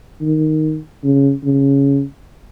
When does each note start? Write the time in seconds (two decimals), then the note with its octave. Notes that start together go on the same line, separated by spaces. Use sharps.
0.21 D#3
1.04 C#3
1.44 C#3